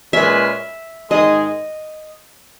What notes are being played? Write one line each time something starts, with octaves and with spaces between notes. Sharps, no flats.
A#2 G#3 C#4 G#4 B4 E5
G#2 D#3 G#3 D#4 G#4 D#5